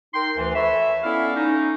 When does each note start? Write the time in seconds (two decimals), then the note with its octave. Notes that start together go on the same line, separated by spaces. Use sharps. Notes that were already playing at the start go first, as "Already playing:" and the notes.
0.14 D#4 A#4 G5 C6
0.36 D2 E3
0.54 A4 B4 C#5 E5
1.03 B3 C#4 E4 A4 D5 F5
1.36 C#4 D#4